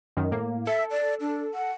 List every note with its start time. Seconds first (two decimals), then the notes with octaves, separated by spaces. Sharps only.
0.17 F#2 D#3
0.31 A2 A#3
0.67 A4 E5
0.91 D5
1.21 D4
1.54 F#5